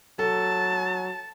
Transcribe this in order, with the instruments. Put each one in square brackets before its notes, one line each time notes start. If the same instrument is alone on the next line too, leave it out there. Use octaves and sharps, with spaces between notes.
[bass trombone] F#3 [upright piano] A4 [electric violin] A5